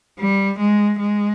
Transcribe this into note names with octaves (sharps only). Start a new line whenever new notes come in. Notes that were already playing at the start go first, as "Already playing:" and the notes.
G3
G#3
G#3